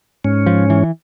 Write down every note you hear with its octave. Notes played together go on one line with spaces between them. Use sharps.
G#2 C#4
F3
E3